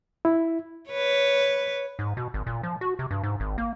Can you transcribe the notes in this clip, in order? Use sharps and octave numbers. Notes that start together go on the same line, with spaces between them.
E4
B4 C#5
G#2
B2
G#1
A#2
F3
F#4
C3
G2
G#2
G#1
A#3